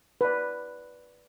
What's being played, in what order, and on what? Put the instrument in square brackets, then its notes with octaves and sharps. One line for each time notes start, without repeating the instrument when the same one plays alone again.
[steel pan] B4 D5